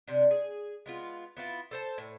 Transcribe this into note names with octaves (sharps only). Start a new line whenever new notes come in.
C3 D4
G#4
G#3 B3 F4
B3 E4 F4
A4 C5 A5
A2